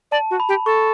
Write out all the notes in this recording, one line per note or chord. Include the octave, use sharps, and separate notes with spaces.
D5 A5
F#4
B5
G4
A4 C#6